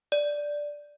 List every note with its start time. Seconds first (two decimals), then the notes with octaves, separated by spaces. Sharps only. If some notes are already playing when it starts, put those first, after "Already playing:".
0.12 D5